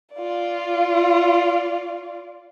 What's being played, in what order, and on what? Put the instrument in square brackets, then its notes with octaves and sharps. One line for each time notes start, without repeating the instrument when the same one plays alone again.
[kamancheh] F4 D5